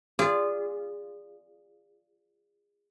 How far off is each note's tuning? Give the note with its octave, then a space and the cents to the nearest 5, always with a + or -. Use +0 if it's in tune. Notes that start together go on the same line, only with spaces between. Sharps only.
F4 -15 G#4 -25 D5 +0